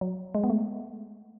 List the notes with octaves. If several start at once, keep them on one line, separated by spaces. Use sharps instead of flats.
F#3
G#3
B3
A3